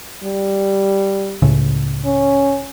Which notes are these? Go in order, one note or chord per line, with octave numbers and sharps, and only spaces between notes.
G3
C#2 A2 C#3
C#4